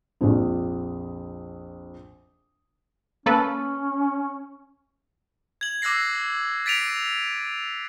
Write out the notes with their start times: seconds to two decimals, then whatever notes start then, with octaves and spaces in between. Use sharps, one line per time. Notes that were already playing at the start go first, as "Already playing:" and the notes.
0.21 A#1 F2
3.26 A#3 C#4 A4 B4
5.61 G#6 F#7
5.82 D6 E6 F#6 A#6 C7
6.66 A6 B6 D7 D#7 F7